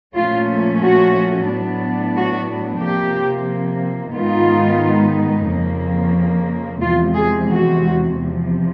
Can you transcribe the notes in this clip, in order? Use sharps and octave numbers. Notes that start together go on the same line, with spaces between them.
A#2 F3 A3 C#4 F4
F#4
A2 F#3 B3 D4
F#4
C3 F3 A#3 G4
G#2 D#3 G#3 B3 D#4 F4
F2 C#3 F3 A#3
E2 C3 F3 G#3 F4
G#4
F#4
E2 C3 F3